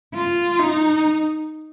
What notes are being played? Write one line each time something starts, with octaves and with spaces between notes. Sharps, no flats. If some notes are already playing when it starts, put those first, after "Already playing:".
F4
D#4